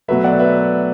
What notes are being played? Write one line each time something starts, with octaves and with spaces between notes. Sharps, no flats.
B2 F#3 A3 B4 E5
D5 F#5
B4 E5